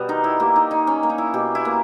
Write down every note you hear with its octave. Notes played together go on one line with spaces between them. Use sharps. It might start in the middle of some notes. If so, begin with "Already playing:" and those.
Already playing: B2 G3 B3
D#3 D#4
E4
A#3 G4
D#4
D#3 D#4
C#4
A#3
D#4
E4
B2 G4
E4
A#3